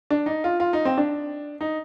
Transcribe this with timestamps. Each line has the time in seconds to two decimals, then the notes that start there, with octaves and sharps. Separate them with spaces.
0.11 D4
0.26 D#4
0.44 F4
0.60 F4
0.73 D#4
0.85 C4
0.98 D4
1.61 D#4